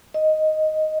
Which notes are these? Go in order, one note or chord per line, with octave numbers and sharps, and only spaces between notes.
D#5